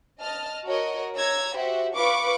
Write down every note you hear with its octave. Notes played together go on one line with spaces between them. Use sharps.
D#5 A5 F6
F#4 A#4 C#5 D#5
C#5 A#5 E6 G#6
F#4 G4 C5 E5
F4 B4 F5 C#6 D6